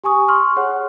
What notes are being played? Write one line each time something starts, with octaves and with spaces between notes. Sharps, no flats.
G4 G#5 C#6 D#6
C6 C#6 F6
G#4 C#5 F#5